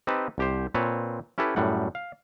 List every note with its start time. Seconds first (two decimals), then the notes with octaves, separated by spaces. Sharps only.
0.07 C4 D#4 G4 B4 A5
0.38 C2 G4 C5
0.74 A#2 C4 B4 C#5 A5
1.38 C#4 E4 G4 A4 B4
1.56 F#2 A2 G3 F#5
1.95 F5